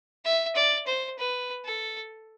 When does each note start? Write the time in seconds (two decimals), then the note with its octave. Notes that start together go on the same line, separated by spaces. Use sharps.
0.25 E5
0.56 D5
0.87 C5
1.19 B4
1.65 A4